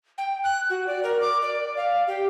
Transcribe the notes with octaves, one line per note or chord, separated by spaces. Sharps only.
G5
F#6
F#4
D5
A#4
D6
D5
F5
G4